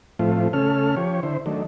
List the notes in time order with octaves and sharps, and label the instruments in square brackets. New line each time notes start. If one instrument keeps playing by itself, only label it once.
[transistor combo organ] A2 F3 A3 C4 F4
C#3 A3 C#4 A4 F6
F3 G4 C#5
D3 E4 C5
D#3 F#3 A3 D4